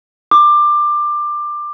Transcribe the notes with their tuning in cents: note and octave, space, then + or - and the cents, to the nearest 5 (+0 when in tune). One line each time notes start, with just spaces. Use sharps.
D6 +20